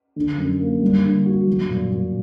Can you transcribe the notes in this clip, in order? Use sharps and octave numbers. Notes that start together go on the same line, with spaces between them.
D3
F#2
A#3
G3
D3
F#4
F#3
A#2
A#2